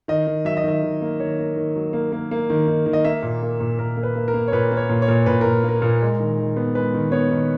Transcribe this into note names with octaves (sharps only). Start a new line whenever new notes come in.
D#3 D#5
D#3
F#3 E5
D#5
D#3 E5
D#3
A#3
D#3 C#5
A#3
D#3
F#3
A#3
A#3
A#3
D#3
D#3
D#3
D#5
A#3 E5
A#2
A#3
A#2
A#2 A#4
A#3
B4
A#3
A#4
A#3
C#5
A#2 B4
A#3
C#5
A#2
C#5
A#2
A#2 B4
A#2 A#4
A#3
A#4
A#2
G#3
D#3
D#3
B3
G#3 B4
D#3
B3 C#5
D#3